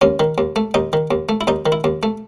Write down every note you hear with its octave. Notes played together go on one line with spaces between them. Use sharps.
D#2 C#4
D#3
D#2
A3
D#2 D#4
D#3
D#2
A3
E4
D#2 D#4
D#3
E4
D#2
A3